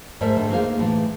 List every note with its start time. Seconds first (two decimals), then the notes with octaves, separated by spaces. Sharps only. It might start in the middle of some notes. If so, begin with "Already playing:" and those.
0.21 G#2 D#3 A3 A#4 C5 E5
0.36 G#2 D3 D#3 A3
0.50 A#3 D#4 G#4 C5 F5
0.79 A2 E3